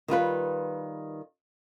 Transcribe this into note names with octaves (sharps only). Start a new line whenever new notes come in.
D#3 G3 F4 B4